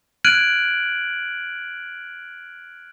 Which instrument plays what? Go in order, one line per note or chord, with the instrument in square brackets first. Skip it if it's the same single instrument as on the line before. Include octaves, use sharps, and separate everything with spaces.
[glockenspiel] F6 F#6 G#6 D7 D#7 F#7